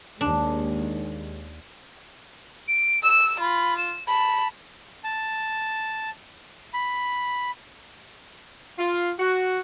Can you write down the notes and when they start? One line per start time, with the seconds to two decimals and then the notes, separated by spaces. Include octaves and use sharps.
0.21 D#2 G#3 D4
2.68 D7
3.03 E6 E7
3.40 F4 B5
3.78 E7
4.08 A5 B5
5.04 A5
6.74 B5
8.79 F4
9.20 F#4